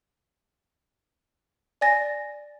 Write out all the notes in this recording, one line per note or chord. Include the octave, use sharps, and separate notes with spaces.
D5 G#5 A6 A#6